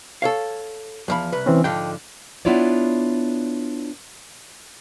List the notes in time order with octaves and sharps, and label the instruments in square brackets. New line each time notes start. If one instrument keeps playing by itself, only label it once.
[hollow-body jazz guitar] A4 C#5 F5
E2 F3 B5
C2 B4
[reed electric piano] E3 C4 C#4
[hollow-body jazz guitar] G#2 D3 F3 [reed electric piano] G5
[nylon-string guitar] B3 D4 E4 F4 C#5 D5